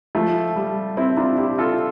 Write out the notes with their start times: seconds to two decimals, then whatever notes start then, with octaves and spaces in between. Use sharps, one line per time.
0.15 F3 A3
0.56 G3
0.97 C4 E4
1.17 D4 F4
1.38 E4 G4
1.58 F4 A4